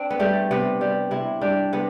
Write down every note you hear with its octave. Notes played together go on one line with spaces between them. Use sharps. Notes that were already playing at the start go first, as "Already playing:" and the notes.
Already playing: C4 D4
B3
G3 A3
C3 B3
G3
C3 E4
G3 D4
C3 B3